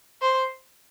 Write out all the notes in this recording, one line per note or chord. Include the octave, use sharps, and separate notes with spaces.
C5